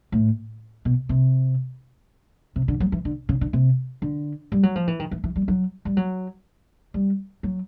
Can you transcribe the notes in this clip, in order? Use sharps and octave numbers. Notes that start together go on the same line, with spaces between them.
A2
B2
C3
C3
D3
F#3
E3
D3
C#3
D3
C3
D3
G3
F#3
F3
E3
D#3
E3
E3
G3
F#3
G3
F#3
G3
F#3